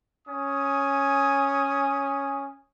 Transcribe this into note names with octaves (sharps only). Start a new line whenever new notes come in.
C#4 G#5 D#6